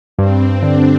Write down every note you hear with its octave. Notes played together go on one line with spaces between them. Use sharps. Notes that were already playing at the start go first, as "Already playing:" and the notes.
G2 C4
D3 D4